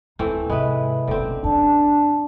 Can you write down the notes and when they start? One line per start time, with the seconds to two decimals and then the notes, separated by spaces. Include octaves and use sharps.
0.19 D1 E3 A3 C4 D#4 G5
0.50 G#2 C3 G#3 B4 E5 B5
1.08 F#1 B1 D3 C4
1.44 F#2 D4 A5